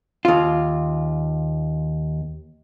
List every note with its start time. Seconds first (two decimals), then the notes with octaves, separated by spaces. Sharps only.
0.25 D#2 F4